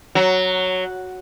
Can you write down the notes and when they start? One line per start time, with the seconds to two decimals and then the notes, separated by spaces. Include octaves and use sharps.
0.15 F#3